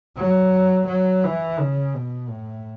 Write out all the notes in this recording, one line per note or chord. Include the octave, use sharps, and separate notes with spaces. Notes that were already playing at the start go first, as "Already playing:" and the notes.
F#3
F#3
E3
C#3
B2
A2